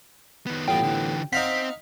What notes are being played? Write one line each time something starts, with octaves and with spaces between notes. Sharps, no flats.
D#3 B3
A1 G2 B3 F4 G5
D3 E3
C4 D#4 F5 F#5 B6